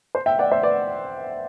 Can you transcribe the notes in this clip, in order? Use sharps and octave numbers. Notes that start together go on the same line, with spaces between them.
C5
E5 G5
D5 F#5
C5 E5
B4 D5